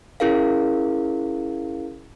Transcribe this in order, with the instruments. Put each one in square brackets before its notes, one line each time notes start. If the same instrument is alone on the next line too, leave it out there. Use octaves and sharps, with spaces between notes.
[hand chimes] C#4 E4 G#4 A#4 F5